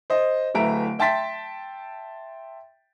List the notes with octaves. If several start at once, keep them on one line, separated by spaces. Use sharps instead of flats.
C5 D#5
D1 A3 B4 E5 A#5 D7
E5 G5 A5 C6 A6 B6